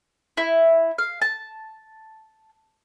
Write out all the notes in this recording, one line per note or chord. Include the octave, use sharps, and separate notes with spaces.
E4
F5
A5